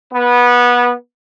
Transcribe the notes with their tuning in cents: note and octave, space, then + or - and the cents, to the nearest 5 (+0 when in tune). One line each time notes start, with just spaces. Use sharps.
B3 -20